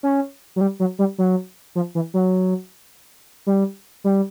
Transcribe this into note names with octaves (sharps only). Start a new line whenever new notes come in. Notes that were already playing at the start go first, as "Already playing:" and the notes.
C#4
F#3
G3
F#3
G3
F#3
F3
E3
F#3
G3
G3